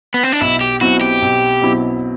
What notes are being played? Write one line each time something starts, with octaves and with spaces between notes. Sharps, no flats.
B3
C4
D4
B1 E4
G4
B2 F#3 C4 E4 F#4
G4
B1
B2 F#3 C4 E4